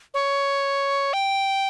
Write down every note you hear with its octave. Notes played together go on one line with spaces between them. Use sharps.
C#5
G5